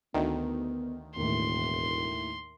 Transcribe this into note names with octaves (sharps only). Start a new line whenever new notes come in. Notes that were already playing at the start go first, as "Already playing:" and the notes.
D2 D#3 B3
E1 D#2 A2 C6